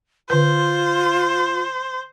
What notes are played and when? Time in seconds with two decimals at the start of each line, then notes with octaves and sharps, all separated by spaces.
0.30 D3 F4 B4 C5